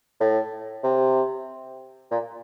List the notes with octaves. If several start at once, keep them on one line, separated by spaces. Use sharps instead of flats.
A2
C3
A#2